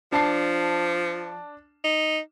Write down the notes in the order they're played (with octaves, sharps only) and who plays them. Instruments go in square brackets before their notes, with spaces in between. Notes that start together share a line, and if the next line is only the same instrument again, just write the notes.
[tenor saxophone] F3 [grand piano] D4 A5 C7
[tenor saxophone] D#4